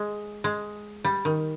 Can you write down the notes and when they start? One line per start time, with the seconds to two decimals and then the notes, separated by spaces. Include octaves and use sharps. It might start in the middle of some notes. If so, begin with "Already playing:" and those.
Already playing: G#3
0.44 G#3
1.04 G3
1.25 D#3